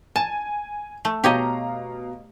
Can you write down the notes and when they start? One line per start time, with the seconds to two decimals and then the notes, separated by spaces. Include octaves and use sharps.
0.16 G#5 A5
1.05 A3
1.24 B2 G4 C#5 D#5 F5 A#5